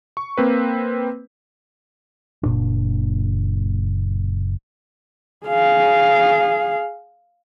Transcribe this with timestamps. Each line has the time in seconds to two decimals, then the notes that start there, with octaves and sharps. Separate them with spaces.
0.17 C#6
0.38 A#3 C4 B4
2.43 F#1 A#2 D4
5.46 G#4 F5